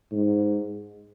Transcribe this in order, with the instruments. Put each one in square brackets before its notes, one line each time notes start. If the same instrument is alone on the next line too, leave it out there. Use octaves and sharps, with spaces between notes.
[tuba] G#2